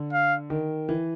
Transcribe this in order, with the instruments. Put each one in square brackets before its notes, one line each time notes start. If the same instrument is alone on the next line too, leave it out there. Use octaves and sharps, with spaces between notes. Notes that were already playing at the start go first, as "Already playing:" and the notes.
Already playing: [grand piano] D3
[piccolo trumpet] F5
[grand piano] D#3
E3